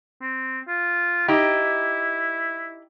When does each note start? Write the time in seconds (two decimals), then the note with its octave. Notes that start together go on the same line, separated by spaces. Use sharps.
0.22 C4
0.68 F4
1.28 D#4 E4 G4